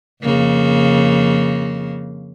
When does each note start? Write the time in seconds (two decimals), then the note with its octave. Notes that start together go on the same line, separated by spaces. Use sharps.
0.23 F2 C#3 A#3